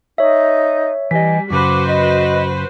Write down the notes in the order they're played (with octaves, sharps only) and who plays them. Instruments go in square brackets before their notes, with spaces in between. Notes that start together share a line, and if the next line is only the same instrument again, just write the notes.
[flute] D#4 [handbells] C#5 E5
[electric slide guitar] E3 D#5 [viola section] G3 [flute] G#5 [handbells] B6
[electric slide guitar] F#2 C#3 [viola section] F#4 B4 C5 [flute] D6
[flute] D#5